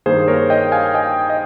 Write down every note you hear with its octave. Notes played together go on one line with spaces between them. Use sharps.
G2 D#3 A#3 G#4 C5
A#4 C#5
D#5 G5
F5 G#5
D#5 G5
D#5